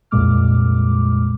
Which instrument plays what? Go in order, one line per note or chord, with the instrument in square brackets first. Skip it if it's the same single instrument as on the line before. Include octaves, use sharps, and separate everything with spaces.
[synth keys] C2 F2 A#2 G#3 D6 F6